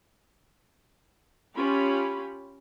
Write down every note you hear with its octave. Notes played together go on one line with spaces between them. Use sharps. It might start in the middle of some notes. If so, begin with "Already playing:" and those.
C#4 F4 G4 B5